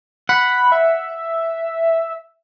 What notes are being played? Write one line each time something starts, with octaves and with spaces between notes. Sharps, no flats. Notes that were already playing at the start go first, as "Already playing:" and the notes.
F#5 B5
E5